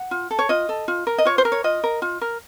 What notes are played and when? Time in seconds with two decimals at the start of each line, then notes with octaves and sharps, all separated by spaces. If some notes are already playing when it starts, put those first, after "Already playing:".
Already playing: F#5
0.11 F4
0.31 A4
0.39 C#5
0.49 F4 D#5
0.69 A4
0.88 F4
1.07 A#4
1.18 D#5
1.25 F4 C#5
1.38 C5
1.45 A#4
1.52 C#5
1.64 F4 D#5
1.84 A#4
2.02 F4
2.21 A#4